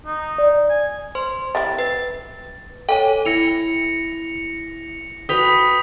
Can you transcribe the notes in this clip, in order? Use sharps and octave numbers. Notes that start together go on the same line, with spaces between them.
D#4
D5
G#5
C5 C6
G3 C4 E4 A6
B4 A6
A4 C#5 G5 G#5
E4 A#6 C#7 F7
F#4 B4 G5 D#6 B6 F7